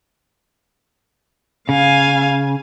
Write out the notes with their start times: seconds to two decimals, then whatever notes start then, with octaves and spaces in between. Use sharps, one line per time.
1.69 C#3 F5 G#5